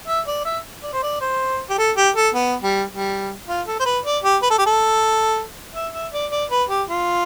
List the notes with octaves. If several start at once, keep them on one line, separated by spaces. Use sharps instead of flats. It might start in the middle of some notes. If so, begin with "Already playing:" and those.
E5
D5
E5
D5
C5
D5
C5
G4
A4
G4
A4
B3
G3
G3
F4
A4
C5
B4
D5
G4
B4
A4
G4
A4
E5
E5
D5
D5
B4
G4
F4